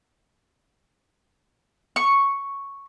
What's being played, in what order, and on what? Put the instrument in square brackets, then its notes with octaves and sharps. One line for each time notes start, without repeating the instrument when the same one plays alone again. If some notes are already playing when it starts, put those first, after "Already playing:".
[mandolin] C#6